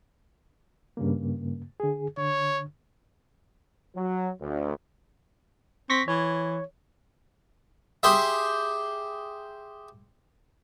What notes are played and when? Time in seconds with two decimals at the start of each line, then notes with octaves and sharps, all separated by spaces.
0.97 G2 C#3 A#3
1.80 D3 G#4
2.18 D3 C#5
3.95 F#3
4.41 D2
5.90 C4 C#6 A#6 B6
6.08 E3 C#5
8.03 G4 G#4 C5 E5